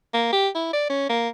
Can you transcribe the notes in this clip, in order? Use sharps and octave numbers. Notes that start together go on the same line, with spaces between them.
A#3
G4
E4
D5
C#4
A#3